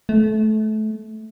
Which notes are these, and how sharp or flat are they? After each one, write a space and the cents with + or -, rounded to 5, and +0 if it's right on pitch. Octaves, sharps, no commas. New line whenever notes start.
A3 -25